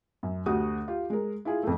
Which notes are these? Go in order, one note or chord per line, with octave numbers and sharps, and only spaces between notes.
F#2
D2 F#4 G4 D#6
F4 G4
G#3 A#4
E4 F4 G#4
F2 A3